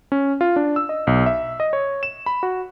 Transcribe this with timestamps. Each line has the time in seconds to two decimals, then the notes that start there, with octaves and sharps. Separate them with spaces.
0.12 C#4
0.41 F4
0.56 D4
0.76 E6
0.89 D#5
1.07 B1
1.26 E5
1.60 D#5
1.73 C#5
2.03 E7
2.26 B5
2.43 F#4